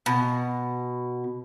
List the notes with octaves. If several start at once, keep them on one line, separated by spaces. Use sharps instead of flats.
B2